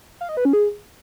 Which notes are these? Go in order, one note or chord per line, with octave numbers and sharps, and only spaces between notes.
F5
D#5
B4
C#4
G#4